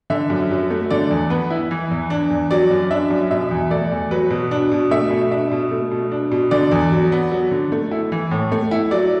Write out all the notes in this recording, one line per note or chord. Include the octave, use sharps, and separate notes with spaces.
D3 E5
F#2
F#3
A3
D3 D5
E2
B3 B4
E4
E3
E2
D4
E2
F#3 D5
F#2
D4 E5
F#2
B2 E5
E2
A3 D5
E2
F#3 B4
B2
D4
B2
A3 E5
B2
D4 E5
B2
A3
B2
D4
B2
D3 D5
E2
F#3
B3
F#3
D3
A3
E4
E3
A2
A3
E4
F#3 D5